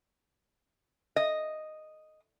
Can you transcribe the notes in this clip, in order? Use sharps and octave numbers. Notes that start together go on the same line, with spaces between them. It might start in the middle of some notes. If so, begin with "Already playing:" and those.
D#5